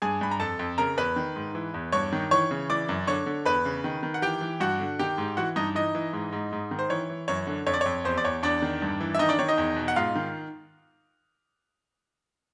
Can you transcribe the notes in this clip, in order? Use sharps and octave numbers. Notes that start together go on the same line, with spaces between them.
G2 G#4 G#5
G2 B5
A#5
F2 A4 A5
F2
C#3 A#4 A#5
E2 B4 B5
D#3
G#2
E3
E2
G2 C#5 C#6
D#3
E3 C#5 C#6
C#3
E3 D5 D6
F#2
D3 C#5 C#6
D3
E2 B4 B5
C#3
D#3
D#3
F#5
E3 G4 G5
E3
G2 F#4 F#5
D3
D#3 G4 G5
G#2
E3 F#4 F#5
G2 D#4 D#5
E3 D#4 D#5
E3
G#2
G#2
G#2
D#3
C5
E3 C#5
E3
F#2 C#5
D3
F2 C#5
D5
F2 C#5
E2 C5
D5
E2 C#5
E2 D4 D5
D#3
G2
E3
E5
D#3 D#4 D#5
D4 D5
D#3 C#5
D#4 D#5
E2
B2
F#5
G#2 F4 F5
D#3